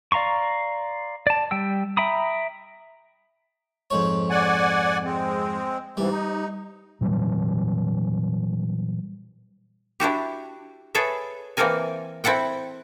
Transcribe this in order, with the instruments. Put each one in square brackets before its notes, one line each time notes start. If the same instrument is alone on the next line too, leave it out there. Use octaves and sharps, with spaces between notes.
[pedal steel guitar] D5 F5 A#5 C6 C#6
D5 A5
G3 G5 E6
E5 G5 A#5 B5 D#6
[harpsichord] F2 G#2 C#5
[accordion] D5 F#5 G#5
G#3 C4
[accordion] G#2 C3 E3 [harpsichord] G3
[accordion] D#4
[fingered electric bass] A#2 E3 F#3 G3
[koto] D4 E4 F#4 G4
G#4 A4 B4 C#5 E5
E3 A#3 C4 A4 A#4 G#5
C4 E4 A4 F#5 G5